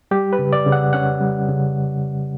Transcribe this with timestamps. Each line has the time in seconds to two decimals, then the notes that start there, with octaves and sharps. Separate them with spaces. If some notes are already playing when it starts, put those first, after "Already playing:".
0.11 G3 G4
0.33 B4
0.39 C#3
0.53 D5
0.66 C#3
0.72 F#5
0.93 C#4 F#5
1.21 G3
1.49 C#3